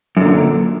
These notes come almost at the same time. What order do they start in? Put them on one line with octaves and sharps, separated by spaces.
F#2 D3 A#2